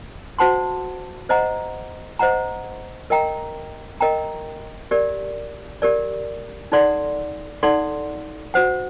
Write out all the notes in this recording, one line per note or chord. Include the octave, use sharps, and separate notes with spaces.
F#4 C5 F#5 A5 C6
C5 D#5 F#5 A#5
C5 D#5 F#5 A#5
A#4 D#5 G5 A#5
A#4 D#5 G5 A#5
G4 A#4 D5
G4 A#4 D5
D#4 A4 D5 F#5 C6
D#4 A4 D5 F#5 C6
F#4 C5 F#5